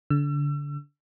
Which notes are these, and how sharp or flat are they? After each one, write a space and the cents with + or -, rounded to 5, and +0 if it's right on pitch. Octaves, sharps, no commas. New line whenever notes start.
D3 -25 E6 +35